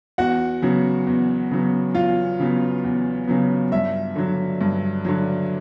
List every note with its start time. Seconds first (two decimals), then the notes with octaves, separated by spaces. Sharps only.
0.18 E2 F#4 F#5
0.62 C#3 F#3 B3
1.07 E2
1.51 C#3 F#3 B3
1.94 E2 F4 F5
2.40 C#3 F#3 B3
2.84 E2
3.27 C#3 F#3 B3
3.72 G2 E5
4.16 D3 F#3
4.61 G2
5.05 D3 F#3